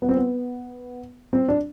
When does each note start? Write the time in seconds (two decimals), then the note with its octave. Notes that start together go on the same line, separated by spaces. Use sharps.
0.02 B3
0.09 C4
0.17 B3
1.33 C4
1.48 D4